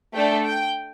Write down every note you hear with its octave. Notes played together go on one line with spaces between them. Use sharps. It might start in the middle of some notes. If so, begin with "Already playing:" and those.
A3 D4 A4 G5
G5